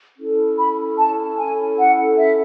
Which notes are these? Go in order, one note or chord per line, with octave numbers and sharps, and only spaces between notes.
C#4 E4 A4
B5
A5
G#5
F#5
E5